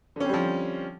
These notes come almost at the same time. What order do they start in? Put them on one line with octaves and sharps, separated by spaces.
D3 C#4 C4 G3 F3